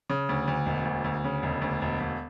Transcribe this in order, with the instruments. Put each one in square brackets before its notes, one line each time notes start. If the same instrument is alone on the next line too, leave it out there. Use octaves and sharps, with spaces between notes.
[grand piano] C#3
D2
D2
E1
D2
D2
C#3
E1
D2
E1
E1